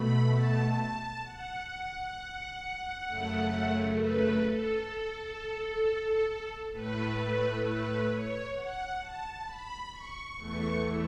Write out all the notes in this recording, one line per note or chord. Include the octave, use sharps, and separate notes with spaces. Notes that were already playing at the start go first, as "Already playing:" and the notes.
Already playing: B2 A3 B5
A5
F#5
F#2 C#3 A3
B4
A4
A2 A3 B4
B4
C#5
F#5
A5
B5
C#6
E2 E3 A3 C#6